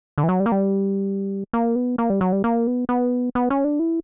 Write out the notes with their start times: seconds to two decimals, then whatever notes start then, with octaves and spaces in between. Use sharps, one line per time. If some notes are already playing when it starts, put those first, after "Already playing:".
0.18 D3
0.23 E3
0.29 F#3
0.40 G3
0.46 A#3
0.52 G3
1.53 A#3
1.76 B3
1.98 A#3
2.10 G3
2.21 F#3
2.32 G3
2.44 A#3
2.67 B3
2.89 B3
3.35 B3
3.50 C#4
3.64 D4
3.79 E4